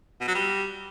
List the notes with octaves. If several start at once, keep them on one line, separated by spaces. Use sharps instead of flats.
B2
F#3
G3